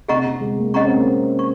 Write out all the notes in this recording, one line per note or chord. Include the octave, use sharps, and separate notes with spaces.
C3 G#4 D#5 F#5 A#5 C#6
C3
G#3
A#3
C#4 G#4 D#5 F#5 A#5 C#6
C4
A#3
C4
C#6